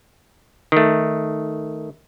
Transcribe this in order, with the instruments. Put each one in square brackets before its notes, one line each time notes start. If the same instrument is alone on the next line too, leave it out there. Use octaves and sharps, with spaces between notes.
[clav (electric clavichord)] D#3 A3